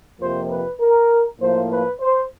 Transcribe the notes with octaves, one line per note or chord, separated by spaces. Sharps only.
F2 C3 F3 A#3 C5
B4
A#4
A2 F3 A#3 C5
B4
C5